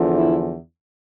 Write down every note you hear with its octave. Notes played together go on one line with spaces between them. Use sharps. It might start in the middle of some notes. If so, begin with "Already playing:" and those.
Already playing: E2 D3 F3
E4